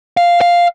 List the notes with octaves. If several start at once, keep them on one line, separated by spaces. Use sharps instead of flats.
F5
F5